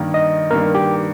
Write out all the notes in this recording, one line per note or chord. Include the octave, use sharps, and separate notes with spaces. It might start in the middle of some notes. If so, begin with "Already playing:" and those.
Already playing: G2 D#3 A#3
D#5
G2 D#3 A#3 A#4
G4